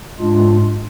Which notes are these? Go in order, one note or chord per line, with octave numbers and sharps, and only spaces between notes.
G#2 G#3 D4 F4